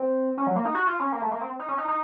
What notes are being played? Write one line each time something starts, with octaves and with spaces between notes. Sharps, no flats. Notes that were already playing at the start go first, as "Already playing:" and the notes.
Already playing: C4
C#4
F#3
A#3
D#4
F#4
F4
C#4
A#3
A3
A#3
C4
D#4
C#4
D#4
D#4